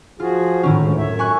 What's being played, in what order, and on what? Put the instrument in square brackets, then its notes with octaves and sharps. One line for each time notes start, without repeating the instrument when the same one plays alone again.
[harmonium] F3 F#4 G#4 [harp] F4
[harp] A2 D#3 C#4
[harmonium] D2 G#2
F#2 C#5 E5
[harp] G#5 C#6 F#6